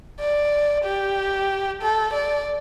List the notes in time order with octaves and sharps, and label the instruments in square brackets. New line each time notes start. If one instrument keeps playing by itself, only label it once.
[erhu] D5
G4
A4
D5